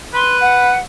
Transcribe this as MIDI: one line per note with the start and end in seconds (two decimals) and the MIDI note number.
0.14 0.74 71
0.14 0.38 84
0.40 0.78 78